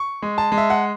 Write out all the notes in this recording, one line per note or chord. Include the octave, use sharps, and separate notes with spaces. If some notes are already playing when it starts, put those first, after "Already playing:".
Already playing: C#6
G#3
A5
G#3
E5
F#5